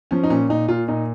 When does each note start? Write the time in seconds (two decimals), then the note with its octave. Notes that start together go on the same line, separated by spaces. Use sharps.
0.11 F3 C#4
0.24 D#4
0.30 A#2 C#4
0.49 A#2 D#4
0.68 A#2 F4
0.88 A#2 D#4